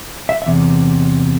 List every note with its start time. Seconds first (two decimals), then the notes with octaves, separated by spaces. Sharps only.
0.29 E5
0.42 E5
0.46 E2 C3